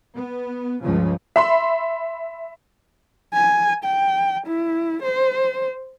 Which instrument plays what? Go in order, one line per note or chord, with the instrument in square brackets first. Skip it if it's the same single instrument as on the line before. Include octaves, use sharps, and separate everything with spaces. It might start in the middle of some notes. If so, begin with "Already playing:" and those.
[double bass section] B3
C#2 G2 C#3 F3
[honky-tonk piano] E5 B5 C6
[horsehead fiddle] G#5
G5
E4
C5